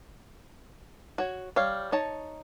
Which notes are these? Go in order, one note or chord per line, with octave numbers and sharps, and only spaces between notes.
F#4 C#5
G3 C#5 F5
D#4 C#5 A5